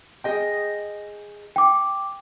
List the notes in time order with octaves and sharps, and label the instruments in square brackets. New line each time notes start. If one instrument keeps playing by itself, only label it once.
[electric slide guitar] G#4 D#5 G5
[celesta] G5 D6